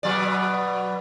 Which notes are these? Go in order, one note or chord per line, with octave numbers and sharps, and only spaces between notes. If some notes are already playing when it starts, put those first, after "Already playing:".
B2 F#3 D5